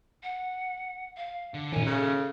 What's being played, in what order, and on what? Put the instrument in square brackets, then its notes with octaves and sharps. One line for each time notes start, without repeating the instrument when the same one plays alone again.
[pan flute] F#5
F5
[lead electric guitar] D3
[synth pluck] A#2 D#3 [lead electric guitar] C#4 E4 [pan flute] G#5
[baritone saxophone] C#3 [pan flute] A4